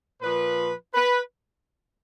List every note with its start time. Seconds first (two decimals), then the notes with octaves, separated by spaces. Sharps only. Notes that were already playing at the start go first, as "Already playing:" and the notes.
0.22 A#2 F3 B4
0.94 B4